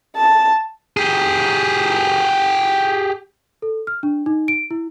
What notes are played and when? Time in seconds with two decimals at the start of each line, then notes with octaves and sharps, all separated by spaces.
0.17 A5
0.97 G4 G#4
3.62 A4
3.87 F6
4.03 D4
4.26 D#4
4.48 D7
4.71 E4